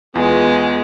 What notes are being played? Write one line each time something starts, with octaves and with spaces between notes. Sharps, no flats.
E2 G#3 B3 F4 G#4